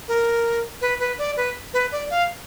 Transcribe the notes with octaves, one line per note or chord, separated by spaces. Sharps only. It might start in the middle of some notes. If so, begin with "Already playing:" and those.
A#4
B4
B4
D5
B4
B4
D5
F5